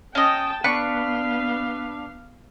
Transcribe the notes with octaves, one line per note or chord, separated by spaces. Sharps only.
C#4 D#5 G5 A5
B3 D4 B4 F5 C#6